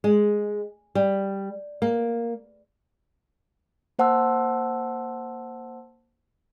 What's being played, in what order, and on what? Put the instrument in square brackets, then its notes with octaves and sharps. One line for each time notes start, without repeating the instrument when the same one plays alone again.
[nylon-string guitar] G#3
G3
A#3
[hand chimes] A#3 C5 F#5 A5 C6 E6